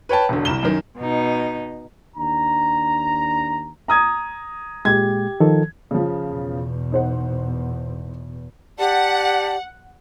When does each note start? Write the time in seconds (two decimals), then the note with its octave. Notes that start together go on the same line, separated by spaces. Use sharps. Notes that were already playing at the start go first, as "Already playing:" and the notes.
0.09 B4 C#5 G5 A5
0.29 E1 D3
0.45 C2 E7 G7
0.63 F#2 D#3
0.98 B2 D#4
2.17 D#2 D4 A#5
3.88 A#5 D#6 G#6
4.85 A#2 G#3 G4 G#6
5.40 D#3 F3 A4
5.91 C#3 F3
6.29 E2 B2
6.92 D#4 C5 F#5
8.78 G4 D5 F#5 A5